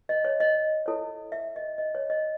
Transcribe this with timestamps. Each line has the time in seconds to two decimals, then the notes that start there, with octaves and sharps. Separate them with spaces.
0.09 D#5
0.25 C#5
0.40 D#5
0.86 E4 A4 C#5
1.32 E5
1.56 D#5
1.78 D#5
1.95 C#5
2.10 D#5